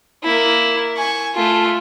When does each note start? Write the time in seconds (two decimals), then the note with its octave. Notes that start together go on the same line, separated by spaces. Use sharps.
0.24 A#3 E4
0.97 G#5 C#6
1.36 A3 F4